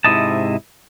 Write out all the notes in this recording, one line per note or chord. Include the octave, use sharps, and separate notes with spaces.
G#2 C3 E4 D#5 A5